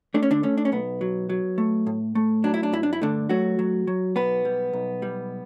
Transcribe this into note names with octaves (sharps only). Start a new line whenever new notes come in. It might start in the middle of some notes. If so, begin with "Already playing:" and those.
A3 D4
C#4
D3 D4
A3 C#4
D4
C#4
B1 B3
F#3
F#3
A3
A2
A3
F#3 D4
E4
D4
G2 E4
D4
E4
D3 A3 D4
F#3 A3 F#4
F#3
F#3
B1 B3 B4
G3
B1
G3